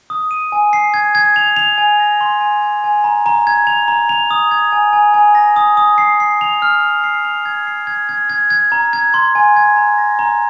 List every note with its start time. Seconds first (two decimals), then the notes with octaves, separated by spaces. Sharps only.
0.10 D#6
0.31 D#7
0.52 G#5
0.73 C7
0.94 G#6
1.15 G#6
1.36 F7
1.56 F7
1.78 G#5
2.00 A#6
2.21 C6
2.41 G#5
2.62 G#6
2.84 G#5
3.04 A#5
3.26 A#5
3.47 G#6
3.67 F7
3.88 A#5
4.09 F7
4.31 D#6
4.51 G#6
4.73 G#5
4.93 G#5
5.14 G#5
5.35 A#6
5.56 D#6
5.77 D#6
5.98 C7
6.20 C7
6.41 F7
6.62 F6
6.83 F7
7.04 C7
7.25 F7
7.46 G#6
7.67 C7
7.87 G#6
8.09 G#6
8.30 G#6
8.50 G#6
8.72 A#5
8.93 G#6
9.14 C6
9.35 G#5
9.56 G#6
9.76 A#5
9.98 A#6
10.19 A#5